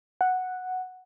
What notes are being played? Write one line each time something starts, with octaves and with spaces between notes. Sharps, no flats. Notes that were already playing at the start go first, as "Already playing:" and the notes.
F#5